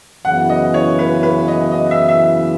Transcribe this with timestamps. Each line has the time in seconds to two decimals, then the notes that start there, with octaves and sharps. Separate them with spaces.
0.25 F#2 C#3 E3 B3 F#5
0.49 D#5
0.74 C#5
0.99 B4
1.23 B4
1.48 D#5
1.72 D#5
1.91 E5
2.09 E5